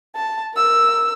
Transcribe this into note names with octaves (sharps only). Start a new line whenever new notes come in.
A5
A#4 E6